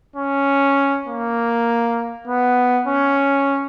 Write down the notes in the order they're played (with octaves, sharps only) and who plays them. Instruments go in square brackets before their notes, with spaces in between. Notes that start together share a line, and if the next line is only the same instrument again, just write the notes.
[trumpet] C#4
A#3
B3
C#4